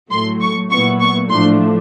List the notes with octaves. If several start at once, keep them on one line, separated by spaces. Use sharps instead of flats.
A2 F#3 A3 C6
C#6
A#2 F#3 B3 E4 C#6
C#6
A2 F3 A3 D4 C6